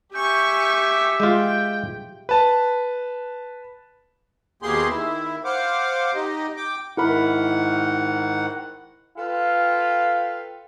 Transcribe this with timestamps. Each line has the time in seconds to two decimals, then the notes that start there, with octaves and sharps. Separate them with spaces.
0.14 G4 E5 G#5 C#6 G6
1.20 G#3 F4 G5 G6
2.29 B4 A5
4.62 D#2 B2 A#3 G4 G#4 C6
4.89 D#3 E4
5.44 C5 F5 F#5 D6
6.15 D#4 G4 D#5
6.56 G5 D6
6.97 G#2 D#3 E4 A#4 F#5 B5
9.17 F4 A4 B4 F5 G5